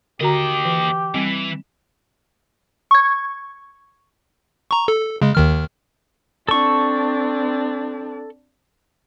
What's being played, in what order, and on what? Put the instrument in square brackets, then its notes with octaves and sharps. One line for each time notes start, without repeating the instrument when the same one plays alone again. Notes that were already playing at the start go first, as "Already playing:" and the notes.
[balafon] D3 F#4 A#5 [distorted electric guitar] A#3 D#5 [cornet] G4
[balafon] E3
[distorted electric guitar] E3 [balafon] G3 C4
[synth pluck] C#6 G#6
[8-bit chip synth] A#5 C#6
A4
C#3 G#3
D#2 D#3 F6
[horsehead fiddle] C4 D4 [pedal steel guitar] A4 C#6